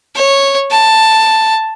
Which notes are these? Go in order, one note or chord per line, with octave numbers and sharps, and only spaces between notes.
C#5
A5